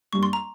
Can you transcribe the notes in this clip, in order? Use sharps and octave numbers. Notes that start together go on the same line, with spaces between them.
G2 G3 A#3 C#6
C6
A#5